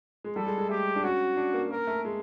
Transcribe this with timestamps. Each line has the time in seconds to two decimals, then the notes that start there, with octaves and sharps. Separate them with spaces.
0.24 G#3
0.36 G3 A4
0.47 G#3
0.58 G#3
0.69 A3 G4
0.96 D4
1.04 C#4 F#4
1.37 D4
1.54 A#3
1.71 A#3 A#4
1.87 A3
2.05 G#3